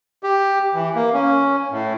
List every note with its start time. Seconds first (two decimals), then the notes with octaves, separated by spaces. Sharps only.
0.23 G4
0.74 E3
0.95 A#3
1.13 C#4
1.71 A2